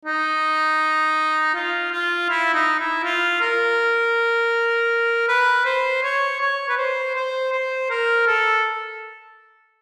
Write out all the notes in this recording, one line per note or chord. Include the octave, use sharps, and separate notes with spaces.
D#4
F4
F4
E4
D#4
E4
F4
A#4
B4
C5
C#5
C#5
B4
C5
C5
C5
A#4
A4